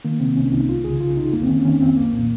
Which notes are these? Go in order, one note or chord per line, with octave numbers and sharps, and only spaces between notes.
D#3 A#3
C3 C4
C2 C#4
C2 D#4
C#2 F4
C#3 G#4
C#3 F4
C#2 D#4
F2 A#3
C4
D#3 C#4
D#3 C#4
F2 C4
C2 A#3
A#2